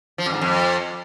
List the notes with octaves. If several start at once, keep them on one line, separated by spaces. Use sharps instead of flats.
F3
F2
G#2
F2